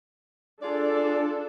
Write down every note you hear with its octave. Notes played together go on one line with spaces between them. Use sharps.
D4 F4 G#4 A4 D5